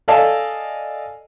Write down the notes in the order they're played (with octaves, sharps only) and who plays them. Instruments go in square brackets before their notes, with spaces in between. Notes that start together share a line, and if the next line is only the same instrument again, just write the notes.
[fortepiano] A4 D5 D#5 F5 G#5 A5